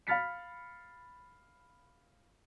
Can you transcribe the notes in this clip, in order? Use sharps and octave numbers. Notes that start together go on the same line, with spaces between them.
F5 B5 F6 A6 B6 C#7